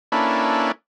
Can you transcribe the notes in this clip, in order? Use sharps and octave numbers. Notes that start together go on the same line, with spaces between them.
A#3 C#4 D4 E4 A4 B4